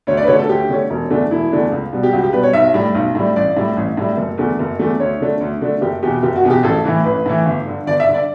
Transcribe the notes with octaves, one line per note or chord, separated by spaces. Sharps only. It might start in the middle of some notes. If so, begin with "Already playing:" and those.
D2 C#5
D5
B4
D3 A3 C#4 C#5
A4
D2 G4
D3 A3 C#4
E1
E2 D3 A3 D4
E1 E4
E2 D3 A3 D4
C#2
B2 G3
G4
C#2 F#4
G4
B2 G3 B4
C#5
B1 E5
A2 G3
B1
A2 G3
A1 D5
A2 G3
A1
A2 G3
F#1
E2 D3 A3
F#1
E2 D3 A3
D2 C#5
D3 A3 D4
D2
D3 A3 D4
F#1 G4
E2 B2 G4
F#1 G4
F#4
E2 B2
G4
A1 A4
A2 E3
A1 B4
A2 E3
G1
G2 D3
G1 D5
E5
G2 D3
D5